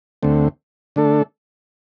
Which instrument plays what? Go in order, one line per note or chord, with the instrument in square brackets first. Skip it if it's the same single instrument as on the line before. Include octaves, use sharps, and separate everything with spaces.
[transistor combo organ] D2 D3 A3 C4
D3 A3 D4 A4